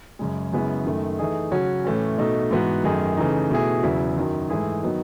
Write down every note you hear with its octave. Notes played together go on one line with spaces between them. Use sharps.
F#2 C#3 G#3
F#2 C#3 G#3 B3 E4
F#2 D#3 A3
E3 A3 D#4 G#4
C#3 F#3 C#4 F#4
A2 E3 A3 C#4
B2 A3 D#4
G#2 E3 B3 F#4
F#2 D#3 A3 D#4 G#4
C#3 E3 A3 D#4
B2 A3 E4 G#4
E2 C#3 F#3 B3 E4
F#2 D#3 F#3
G#2 E3 A3 E4 G#4
D#3 F#3 B3 D#4